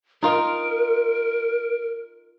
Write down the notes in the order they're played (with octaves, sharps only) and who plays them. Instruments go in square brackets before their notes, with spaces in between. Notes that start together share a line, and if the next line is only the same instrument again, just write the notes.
[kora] D#4 F4 [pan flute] A#4